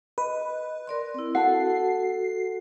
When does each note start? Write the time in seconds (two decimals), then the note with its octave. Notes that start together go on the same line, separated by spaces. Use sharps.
0.18 B4 D#5
0.87 A#4 D5 C6
1.14 C4 E4
1.35 F#4 A4 F#5 A5 C7